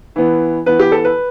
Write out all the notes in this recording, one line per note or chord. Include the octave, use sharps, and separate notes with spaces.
E3 B3
E3 B3 B4
G4
A4
B4